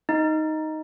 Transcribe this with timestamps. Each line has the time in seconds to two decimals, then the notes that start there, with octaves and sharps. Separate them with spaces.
0.09 D#4